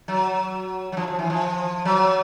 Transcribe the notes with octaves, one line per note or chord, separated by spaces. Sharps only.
F#3
F#3
F3
F3
E3
F3
F#3